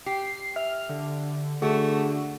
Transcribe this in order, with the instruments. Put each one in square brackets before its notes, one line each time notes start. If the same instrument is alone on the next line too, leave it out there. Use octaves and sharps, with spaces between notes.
[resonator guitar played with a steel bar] G4 [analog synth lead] C7
[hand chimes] E5 [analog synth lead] F6
[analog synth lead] D3
[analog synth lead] D3 [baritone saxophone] A3 [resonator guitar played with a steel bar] F#4 [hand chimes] G#4